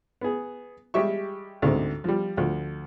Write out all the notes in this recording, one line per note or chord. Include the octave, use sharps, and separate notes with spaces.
B3 G#4
G3 G#3 G4 E5 C#6
D2 G#2 C3
F3 G3
D2 F3